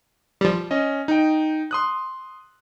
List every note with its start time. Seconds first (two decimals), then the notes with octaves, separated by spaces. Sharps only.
0.41 F3 G3
0.71 C#4 D#5
1.08 D#4 G5
1.71 C6 D#6 F#6